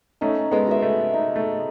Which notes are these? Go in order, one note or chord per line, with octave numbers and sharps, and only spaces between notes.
A3 C#4 D#4
G#3 B3
F#4 B4 E5
A3
D#4
A3